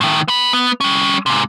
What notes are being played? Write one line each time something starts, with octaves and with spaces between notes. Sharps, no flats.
A2 D#3
B3 B5
B3
G3 C#4
G#2 C3